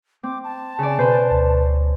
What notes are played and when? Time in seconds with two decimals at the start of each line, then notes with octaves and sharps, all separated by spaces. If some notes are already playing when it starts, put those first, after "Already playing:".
0.23 C4 D6
0.44 A5
0.79 C#3 D5
0.99 B2 B4 C5
1.31 D2